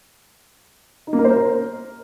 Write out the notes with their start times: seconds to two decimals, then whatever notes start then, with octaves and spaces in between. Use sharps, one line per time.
1.07 D#4
1.13 A#3
1.19 A#4
1.24 C5
1.30 A#4